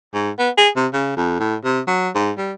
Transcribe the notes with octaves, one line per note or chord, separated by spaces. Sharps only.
G#2
B3
G#4
C3
C#3
F2
A2
C3
F#3
G#2
G3